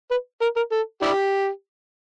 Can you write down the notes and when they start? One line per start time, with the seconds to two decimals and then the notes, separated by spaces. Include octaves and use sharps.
0.11 B4
0.41 A#4
0.56 A#4
0.72 A4
1.02 D4 E4 G4